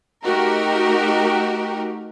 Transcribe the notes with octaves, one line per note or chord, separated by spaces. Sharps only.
A3 D#4 F#4 G4 A#4